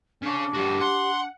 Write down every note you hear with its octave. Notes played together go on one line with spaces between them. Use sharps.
C#3 D4 C#5
G2 F#4 G4
F#5 C6